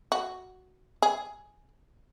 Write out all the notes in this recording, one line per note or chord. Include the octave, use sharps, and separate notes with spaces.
F#4
G#4